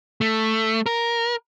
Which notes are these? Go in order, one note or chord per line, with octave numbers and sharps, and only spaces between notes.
A3
A#4